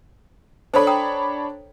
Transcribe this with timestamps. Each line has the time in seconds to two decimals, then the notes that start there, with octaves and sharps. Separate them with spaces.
0.74 D4 A4 C5 C#5 B5
0.87 G5 A#5 D#6